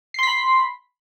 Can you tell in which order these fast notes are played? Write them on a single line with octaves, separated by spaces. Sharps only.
C7 C6 B6 B5